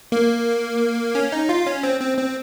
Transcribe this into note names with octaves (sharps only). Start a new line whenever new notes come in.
A#3
C#4
D#4
F4
C#4
C4
C4
C4